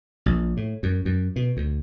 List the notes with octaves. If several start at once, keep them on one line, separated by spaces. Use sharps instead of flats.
A#1
A2
F#2
F#2
B2
D2